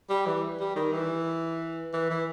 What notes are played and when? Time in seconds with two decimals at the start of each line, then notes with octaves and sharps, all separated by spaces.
0.09 G3
0.26 E3
0.60 G3
0.76 D#3
0.93 E3
1.93 E3
2.10 E3